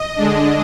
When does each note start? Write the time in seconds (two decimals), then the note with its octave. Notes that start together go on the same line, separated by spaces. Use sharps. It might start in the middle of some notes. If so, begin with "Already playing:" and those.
Already playing: D#5
0.16 D3 G#3 D4